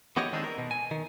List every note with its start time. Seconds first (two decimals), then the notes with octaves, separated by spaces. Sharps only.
0.17 E3 B3 F#4 G4 C#5 D#5
0.33 D#3 G#3 C4 D4 D#4 G#4
0.44 A#4
0.58 B2
0.71 G#5
0.91 D#3